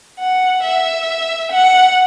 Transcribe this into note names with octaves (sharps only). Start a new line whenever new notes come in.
F#5
E5
F#5